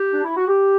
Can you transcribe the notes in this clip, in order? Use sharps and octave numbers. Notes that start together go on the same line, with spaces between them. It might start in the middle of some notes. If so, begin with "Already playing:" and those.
Already playing: G4
D4
E4
F#4
G4